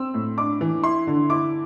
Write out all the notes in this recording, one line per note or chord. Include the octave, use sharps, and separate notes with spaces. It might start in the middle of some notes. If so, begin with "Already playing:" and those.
Already playing: C4 E6
A2
D4 D6
E3
E4 C6
D3
E4 D6